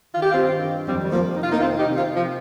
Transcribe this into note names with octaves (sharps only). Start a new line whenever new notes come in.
D#3 F4
G4
C4 F4
G2
D#3
F2 G3 C4
G3
F2 F3 A#3
C3 D#4
F4
A#3 D#4
D#3 C4 F4
D#4 G4
C3
C4 F4
C3
F3